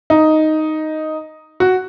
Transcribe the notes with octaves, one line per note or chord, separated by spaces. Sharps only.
D#4
F#4